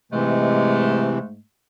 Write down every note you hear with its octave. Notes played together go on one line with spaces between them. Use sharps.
G#2 C3 E3 G#3 A3